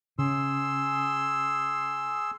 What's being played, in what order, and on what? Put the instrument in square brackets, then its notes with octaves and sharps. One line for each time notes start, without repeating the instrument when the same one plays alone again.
[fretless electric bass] C#3 [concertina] G#4 C6 E6